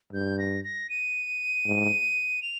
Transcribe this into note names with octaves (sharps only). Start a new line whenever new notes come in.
G2 G6
A#6
A#6
D#7
G#2
F7